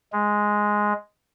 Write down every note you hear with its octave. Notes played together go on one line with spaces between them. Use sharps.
G#3